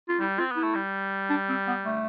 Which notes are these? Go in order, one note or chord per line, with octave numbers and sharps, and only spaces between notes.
F4
G3 E4
C4 F4
B3 E4
A3
G3
D4
C4
B3
A3